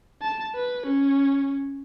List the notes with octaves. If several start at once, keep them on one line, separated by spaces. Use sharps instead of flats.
A5
B4
C#4